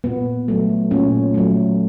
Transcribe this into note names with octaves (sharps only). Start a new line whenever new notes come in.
A#2 B3
F#3 A3
A#2 C#4
F#3 A3